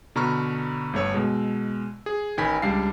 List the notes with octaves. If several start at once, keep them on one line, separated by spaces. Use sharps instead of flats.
B2 D3 A#5 B5 C#6 F6
G1 A3 C#5 E6
B2 G#3
G#4
A1 D#3 G5 G#5 B5 B6
C#2 G3 D4 F5 C7